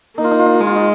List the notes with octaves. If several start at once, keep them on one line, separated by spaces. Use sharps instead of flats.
A#3 D#4
F4
D#4
F4
D#4
F4
G#3 D#4
F4
D#4